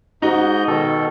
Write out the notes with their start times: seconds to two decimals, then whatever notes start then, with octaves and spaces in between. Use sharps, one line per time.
0.22 G#2 D#4 F#4 D#5 G6
0.67 B2 D#3 A4